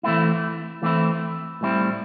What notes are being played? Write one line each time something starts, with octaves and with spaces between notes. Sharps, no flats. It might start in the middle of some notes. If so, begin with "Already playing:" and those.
E3 A3 C4 E4
E3 A3 C4 E4
A2 G3 C4 E4